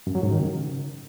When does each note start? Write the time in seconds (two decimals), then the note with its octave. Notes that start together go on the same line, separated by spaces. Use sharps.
0.07 F#2
0.15 F#3
0.23 G#2
0.31 D#3
0.39 C#3